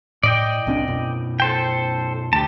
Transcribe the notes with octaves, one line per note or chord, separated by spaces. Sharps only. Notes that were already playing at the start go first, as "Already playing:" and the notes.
A2 D5 D#5 G5
C2 C4 D4
F#2 B2
A4 C5 G5
D2 G4 A5